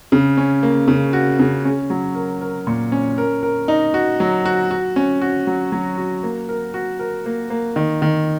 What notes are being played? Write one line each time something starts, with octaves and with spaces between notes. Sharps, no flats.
C#3
C#4
A#3
C#3
F#4
C#3
C#4
F#3
A#4
A#4
A#2
C#4
A#4
A#4
D#4
F#4
F#3
F#4
F#4
C#4
F#4
F#3
F#3
F#4
A#3
A#4
F#4
A#4
A#3
A#3
D#3
D#3